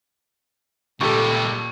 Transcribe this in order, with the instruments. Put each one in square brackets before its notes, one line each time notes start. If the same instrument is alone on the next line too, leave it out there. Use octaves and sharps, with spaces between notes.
[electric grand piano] C#2 G4 A4 [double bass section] A#2 [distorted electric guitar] D#3 G3 [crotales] C#6